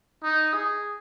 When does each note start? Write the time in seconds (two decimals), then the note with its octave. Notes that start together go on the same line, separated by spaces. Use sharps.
0.24 D#4
0.54 G#4